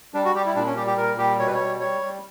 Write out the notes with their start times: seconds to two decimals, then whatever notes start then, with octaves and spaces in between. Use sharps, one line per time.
0.14 G3 D4
0.25 F#4
0.35 G3 G4
0.46 E4
0.56 A#2 D4
0.66 C#4
0.77 G3 G4
0.87 G4
0.97 A#2 A#4
1.18 G3 G4
1.39 B2 C#5
1.47 B4
1.55 G3 C#5
1.80 G3 C#5
2.01 G3